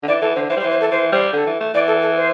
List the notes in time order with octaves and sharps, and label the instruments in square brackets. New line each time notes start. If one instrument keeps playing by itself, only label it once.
[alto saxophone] D3
[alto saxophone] E3 [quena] D5
[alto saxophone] E3 [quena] A4
[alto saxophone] D3 [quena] C5
[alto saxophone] E3 [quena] C5
[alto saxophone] G3
[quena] C5
[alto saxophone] E3
[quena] C5
A4
[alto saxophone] E3 [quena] C5
[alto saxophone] G3 [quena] C5
[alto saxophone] D3 [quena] A4
[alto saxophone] E3
A3
[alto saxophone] E3 [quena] D5
[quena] A4
A4
C5